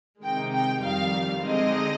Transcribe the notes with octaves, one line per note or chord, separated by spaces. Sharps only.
C3 D#3 G#3 D#4 G5
G5
F2 D#3 G3 F5
D3 G#3 C4 D#4 D#5